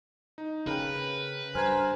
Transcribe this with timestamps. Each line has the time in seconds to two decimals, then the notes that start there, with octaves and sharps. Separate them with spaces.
0.38 D#4
0.67 C#3 A#4 B4 G5
1.55 G2 A#4 C5 G#5 F6 G#6